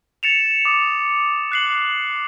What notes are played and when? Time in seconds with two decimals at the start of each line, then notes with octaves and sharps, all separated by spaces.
0.23 A6 C#7 E7 F7
0.65 D6 D#6
1.52 F#6 C7 F#7